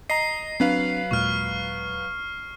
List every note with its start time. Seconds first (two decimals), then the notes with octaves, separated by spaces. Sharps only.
0.10 D#5 A#5 C7
0.60 F#3 C4 D4 B4 F5
1.11 D#2 A#2 G#3 C#6 F6